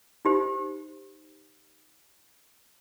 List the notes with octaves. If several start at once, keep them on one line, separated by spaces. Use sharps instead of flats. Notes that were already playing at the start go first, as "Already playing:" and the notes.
D#4 G4 C5